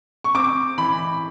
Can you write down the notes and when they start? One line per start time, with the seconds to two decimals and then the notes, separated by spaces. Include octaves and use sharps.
0.24 C#6
0.35 C4 D6
0.78 E3 B5